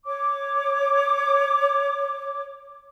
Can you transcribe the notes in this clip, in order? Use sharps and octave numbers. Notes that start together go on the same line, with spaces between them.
C#5 D6